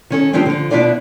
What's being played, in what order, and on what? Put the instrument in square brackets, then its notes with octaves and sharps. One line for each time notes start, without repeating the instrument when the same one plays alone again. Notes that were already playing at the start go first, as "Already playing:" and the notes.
[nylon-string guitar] D#3 C#4 A4
D#3 F3 G3 C4 D4
D3 F3
B2 B3 D4 E4 F4 D5